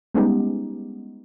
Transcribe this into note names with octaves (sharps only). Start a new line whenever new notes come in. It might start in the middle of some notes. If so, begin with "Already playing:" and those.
G3 G#3 B3 C#4 D#4 G4